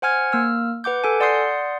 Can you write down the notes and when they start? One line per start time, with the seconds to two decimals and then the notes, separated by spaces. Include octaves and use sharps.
0.02 C5 F#5 G#5 F6 G#6
0.32 A#3 E6 F6
0.84 B4 F#5 D6 G6
1.04 A4 G#5
1.20 D5 F#5 C6 D#6 G6 C7